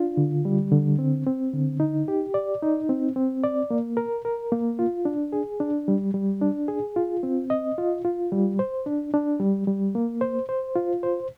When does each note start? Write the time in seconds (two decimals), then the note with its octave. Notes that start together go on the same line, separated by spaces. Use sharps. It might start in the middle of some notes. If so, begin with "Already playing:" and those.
Already playing: D4 F4
0.17 D3
0.45 G3
0.72 D3
0.99 C4
1.27 C4
1.53 D3
1.80 D#4
2.08 G4
2.34 D5
2.62 D#4
2.89 C4
3.16 C4
3.44 D5
3.71 A#3
3.97 A#4
4.25 A#4
4.52 A#3
4.79 F4
5.05 D4
5.33 G#4
5.60 D4
5.88 G3
6.14 G3
6.41 D4
6.68 G#4
6.96 F4
7.23 C4
7.50 D#5
7.78 F4
8.05 F4
8.32 G3
8.59 C5
8.86 D4
9.14 D4
9.40 G3
9.67 G3
9.95 A#3
10.21 C5
10.49 C5
10.76 F4
11.03 C5